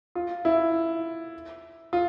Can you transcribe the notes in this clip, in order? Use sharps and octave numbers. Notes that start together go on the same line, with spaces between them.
F4
E4
F4